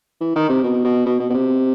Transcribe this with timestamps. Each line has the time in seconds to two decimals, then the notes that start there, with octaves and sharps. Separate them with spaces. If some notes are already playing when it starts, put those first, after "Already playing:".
0.21 E3
0.36 D#3
0.49 C3
0.64 B2
0.85 B2
1.06 B2
1.20 B2
1.30 B2
1.34 C3